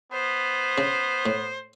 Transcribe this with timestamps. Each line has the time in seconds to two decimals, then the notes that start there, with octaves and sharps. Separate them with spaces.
0.12 B3 C5
0.78 C#3
1.26 A2